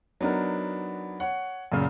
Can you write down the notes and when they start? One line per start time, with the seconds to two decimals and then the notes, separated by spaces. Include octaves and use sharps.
0.21 F#3 B3 D4 D#4 A#4
1.20 C#5 F#5
1.72 F#2 A#2 C#3